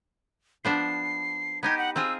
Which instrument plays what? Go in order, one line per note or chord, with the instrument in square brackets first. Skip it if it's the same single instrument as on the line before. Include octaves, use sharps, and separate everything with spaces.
[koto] F3 B3 D4 [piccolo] C7
[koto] B3 D#4 G4 [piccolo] G#6
[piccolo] F#5
[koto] C4 F4 G#4 [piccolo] E6